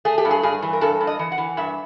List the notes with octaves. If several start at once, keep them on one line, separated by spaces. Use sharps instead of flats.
A3 G#4
G4
G2
G#4
G2 G#4
E3
A#4
G2 A4
G2
D#5
E3
F#5
E3
G2 E5